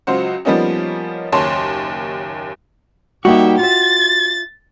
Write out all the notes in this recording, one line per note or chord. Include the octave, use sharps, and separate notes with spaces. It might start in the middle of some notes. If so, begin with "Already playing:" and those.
C#2 F#3 F4 C5 F#5
F3 G3 A#3 B3 C#4 D#4
F#1 D#2 C#5 A5 C6
G3 A#3 D#4 F#4 G4 E5
F4 E5 A6